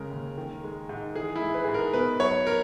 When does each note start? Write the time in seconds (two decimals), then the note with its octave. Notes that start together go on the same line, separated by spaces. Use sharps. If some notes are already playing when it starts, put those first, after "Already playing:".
Already playing: C#3 G#3 A#4
0.11 D#2
0.38 D#3
0.64 G#3
0.89 G#2
1.15 E3 G#4
1.36 E4
1.41 G#3
1.54 B4
1.64 G#2 G#4
1.74 A#4
1.94 B2 B4
2.20 F#3 C#5
2.47 A#4